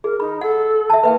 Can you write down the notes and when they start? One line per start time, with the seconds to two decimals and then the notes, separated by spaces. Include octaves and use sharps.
0.04 G#4 A#4
0.20 D#4 B5
0.41 A4 F#5
0.90 E5 A5
1.03 A#3 B4 E5 G5